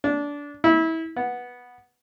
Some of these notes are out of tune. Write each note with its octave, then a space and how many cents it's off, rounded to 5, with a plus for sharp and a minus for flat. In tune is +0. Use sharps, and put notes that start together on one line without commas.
D4 -20
E4 -30
B3 -10